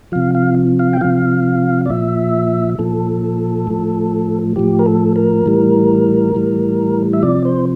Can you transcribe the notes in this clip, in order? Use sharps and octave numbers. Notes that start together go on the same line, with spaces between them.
C3 F3 F5
F5
F5
G5
C3 F3 F5
D5
A#2 F3 E5
A#2 F3 A4
A2 F3
A2 F3 G4
A#4
A4
A#4
A2 E3 G3
A2 E3 G3
E5
C3 F3 D5
C5